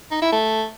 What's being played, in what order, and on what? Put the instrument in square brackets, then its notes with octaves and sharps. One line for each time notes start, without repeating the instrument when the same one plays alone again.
[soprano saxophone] D#4
E4
A3